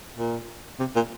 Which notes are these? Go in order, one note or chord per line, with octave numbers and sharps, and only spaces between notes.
A#2
C3
A#2